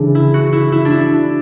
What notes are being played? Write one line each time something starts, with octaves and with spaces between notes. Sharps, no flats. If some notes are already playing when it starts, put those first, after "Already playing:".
Already playing: C#3 E3 D4
E4
F#4
E4
E4
D4
E4